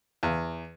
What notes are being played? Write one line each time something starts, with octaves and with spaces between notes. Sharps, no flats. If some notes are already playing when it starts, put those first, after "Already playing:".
E2